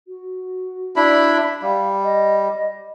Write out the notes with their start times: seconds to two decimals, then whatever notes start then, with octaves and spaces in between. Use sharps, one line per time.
0.07 F#4
0.96 D4 E4 B5
1.62 G3 F5
2.03 D#5